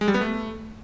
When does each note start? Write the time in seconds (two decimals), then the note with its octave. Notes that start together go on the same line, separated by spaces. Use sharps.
0.01 G#3
0.08 G3
0.14 B3
0.21 A3